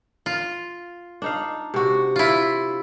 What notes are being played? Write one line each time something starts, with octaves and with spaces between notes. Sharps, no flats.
F4
D4 D#4 F5
C3 F#4
E4 F4